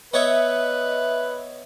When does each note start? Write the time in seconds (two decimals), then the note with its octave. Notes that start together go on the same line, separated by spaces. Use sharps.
0.14 B3 B4 C#5 D#5 E5